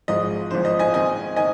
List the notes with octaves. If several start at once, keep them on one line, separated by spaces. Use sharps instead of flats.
G#1 G#2 F3 G#3 D#5
G#1 G#2 F3 G#3 C5
D#5
D#5 G#5
G#2 D#3 C4 D#5 G#5
D#3 D#5 G#5